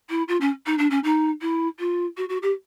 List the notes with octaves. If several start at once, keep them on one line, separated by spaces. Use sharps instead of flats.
E4
F4
C#4
D#4
D4
C#4
D#4
E4
F4
F#4
F#4
G4